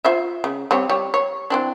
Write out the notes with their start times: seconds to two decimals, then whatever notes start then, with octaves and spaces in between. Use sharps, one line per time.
0.05 F4 C5 E5
0.44 C#3
0.71 G3 C4 C#5
0.89 G3 C#5
1.14 C#5
1.50 E3 C4 D4